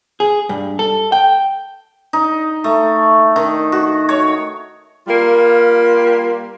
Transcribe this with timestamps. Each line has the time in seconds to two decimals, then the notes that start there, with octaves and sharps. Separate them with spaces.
0.20 G#4
0.49 G2
0.79 A4
1.12 G5
2.13 D#4
2.64 A3
3.36 D#3
3.72 F#4
4.09 C#5
5.07 G3 A#3 F4